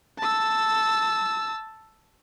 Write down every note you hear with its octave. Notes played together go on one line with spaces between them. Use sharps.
A5 E6